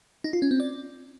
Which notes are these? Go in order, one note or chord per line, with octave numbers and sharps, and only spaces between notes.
D#4
F4
C#4
C4
D5